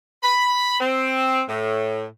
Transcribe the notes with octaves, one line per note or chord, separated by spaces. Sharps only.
B5
C4
A2